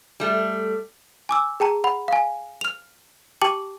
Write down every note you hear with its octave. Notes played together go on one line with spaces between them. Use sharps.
G3 A3
G#5 D6 E6
G#4 G5 A5 A#5
F#5 B5
F5 G#5
F6 F7
G4 G5 A5 D6 F#7